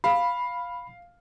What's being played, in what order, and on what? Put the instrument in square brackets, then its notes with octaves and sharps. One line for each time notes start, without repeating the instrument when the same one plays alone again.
[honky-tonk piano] F5 [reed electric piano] B5